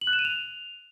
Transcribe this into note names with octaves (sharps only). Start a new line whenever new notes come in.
F#7
F#6
E7
D#7
F7